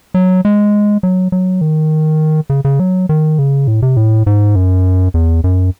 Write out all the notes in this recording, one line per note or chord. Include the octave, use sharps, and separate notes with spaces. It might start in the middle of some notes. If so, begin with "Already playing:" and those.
F#3
G#3
F#3
F#3
D#3
C#3
C#3
F#3
D#3
C#3
A2
C3
A2
G#2
F#2
E2
F#2